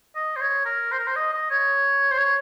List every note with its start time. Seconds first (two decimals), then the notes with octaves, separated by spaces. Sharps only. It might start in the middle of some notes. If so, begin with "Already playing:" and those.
0.15 D#5
0.36 C5
0.40 C#5
0.65 A#4
0.91 C5
0.99 A#4
1.07 C5
1.16 D#5
1.33 D#5
1.50 C#5
2.11 C5
2.17 C#5